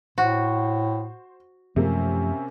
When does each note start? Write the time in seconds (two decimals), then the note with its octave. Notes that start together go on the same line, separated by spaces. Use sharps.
0.18 A2 F#4 C5
1.76 F#2 C3 F3 A3 A#3 C#4